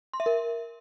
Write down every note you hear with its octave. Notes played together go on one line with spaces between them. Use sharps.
C6
E5
A#4